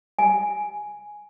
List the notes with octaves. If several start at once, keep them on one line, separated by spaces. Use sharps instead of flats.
G#5